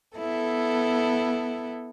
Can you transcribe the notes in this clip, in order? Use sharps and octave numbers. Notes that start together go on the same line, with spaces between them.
B3 E4 A4